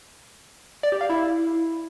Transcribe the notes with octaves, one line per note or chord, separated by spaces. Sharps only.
D5
G4
F5
E4